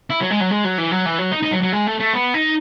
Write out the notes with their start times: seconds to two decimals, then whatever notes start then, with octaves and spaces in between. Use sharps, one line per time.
0.10 E4
0.21 F#3
0.30 G#3
0.40 F#3
0.51 G#3
0.64 F#3
0.78 E3
0.91 F#3
1.06 E3
1.18 F#3
1.32 D#4
1.43 D#4
1.52 F#3
1.62 F#3
1.73 G#3
1.87 A3
2.00 A3
2.14 B3
2.34 D#4